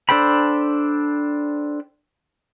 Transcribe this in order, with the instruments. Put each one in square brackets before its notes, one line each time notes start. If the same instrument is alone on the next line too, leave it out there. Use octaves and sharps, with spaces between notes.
[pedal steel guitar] D4 A4 C5 G5 B5